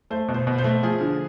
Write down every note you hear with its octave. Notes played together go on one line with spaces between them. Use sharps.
A3 C5
B2
C5
B2
C5
A3
F3 G#4
D3